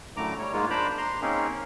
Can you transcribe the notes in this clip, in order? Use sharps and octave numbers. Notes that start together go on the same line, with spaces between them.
F#2 A2 D3 A3 A#5 D6
G3 C#5
G#2 G#3 A#3 F4
D4 C5 A#5 B5 D6
A#5 C6
A#3 C4 C#4 D#4 G#4 A#4